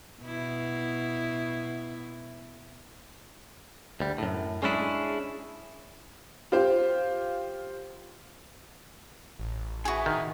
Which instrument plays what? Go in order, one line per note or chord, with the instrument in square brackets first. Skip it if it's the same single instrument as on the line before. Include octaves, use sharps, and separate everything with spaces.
[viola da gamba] B2 E4
[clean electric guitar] D2 G3
F#2 A2
G#3 C#4 D4 E4 G#4
[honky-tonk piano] F4 G4 C5
[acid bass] A1
[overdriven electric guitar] E4 G#5 [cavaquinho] F#4 G#4
[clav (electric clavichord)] D#3